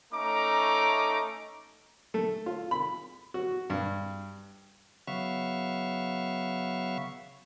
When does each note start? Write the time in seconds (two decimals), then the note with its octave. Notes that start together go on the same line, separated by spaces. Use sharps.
0.13 A3 C#4 D#4 A#5 D6
2.14 A3
2.46 F4
2.71 B5
3.34 F#4
3.70 G2
5.07 C#3 F#3 B3 E5 F5 C#6